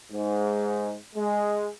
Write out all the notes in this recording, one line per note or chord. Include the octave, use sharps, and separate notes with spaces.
G#2
G#3